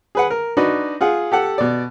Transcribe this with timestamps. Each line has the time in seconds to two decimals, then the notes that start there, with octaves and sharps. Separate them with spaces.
0.15 G#4 B4 F#5
0.30 A#4
0.57 D4 D#4 F#4 B4
1.01 F4 G#4 F#5
1.32 G4 A4 F#5
1.58 B2 D5